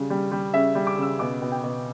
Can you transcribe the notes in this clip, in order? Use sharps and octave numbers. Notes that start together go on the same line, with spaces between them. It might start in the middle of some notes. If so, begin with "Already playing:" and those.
Already playing: C#3 G3
G3
G3
C#3 E5
G3
D6
C#3 E6
B2 D6
B2
G5
B2